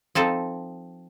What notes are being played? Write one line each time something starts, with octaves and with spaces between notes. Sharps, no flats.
F3 C4 D#4 A4